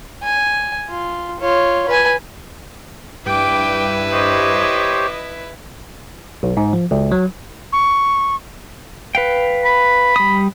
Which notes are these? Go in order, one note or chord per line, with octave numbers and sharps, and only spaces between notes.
G#5
F4
F4 C#5
B4 G#5
G2 E4 B4 G5 D6
G4 C5 C#5 D#5
B1
G#2
F3
C#2
F#3
C#6
B4 F5 G5
B5
G3 D#6